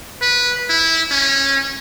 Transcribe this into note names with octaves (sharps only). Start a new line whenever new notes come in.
B4
E4
C#4